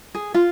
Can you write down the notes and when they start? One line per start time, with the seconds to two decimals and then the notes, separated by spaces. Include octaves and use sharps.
0.15 G#4
0.34 F4